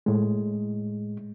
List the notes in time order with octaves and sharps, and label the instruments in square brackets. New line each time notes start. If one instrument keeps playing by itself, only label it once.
[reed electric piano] A2 G#3